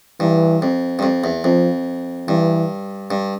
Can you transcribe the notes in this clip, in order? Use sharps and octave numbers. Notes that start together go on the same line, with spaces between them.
G2 E3
F2
G2
F2
E2
F2 F3
G2 E3
G2